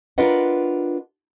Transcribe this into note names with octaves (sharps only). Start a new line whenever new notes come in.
D4 F4 A#4 B4 D#5 F#5